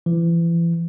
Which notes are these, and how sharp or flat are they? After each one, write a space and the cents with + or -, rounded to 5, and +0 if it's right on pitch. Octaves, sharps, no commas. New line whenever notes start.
E3 +35